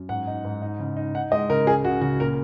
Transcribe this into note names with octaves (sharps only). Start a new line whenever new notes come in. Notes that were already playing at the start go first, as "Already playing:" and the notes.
Already playing: F#2
G#2 F#5
D#4
G#2
D#4
C#3
D#4
D#4 F#5
G#3 D#5
C#3 A#4
C#2 G#4
C#2 F#4
C#3 F#4
A#2 A#4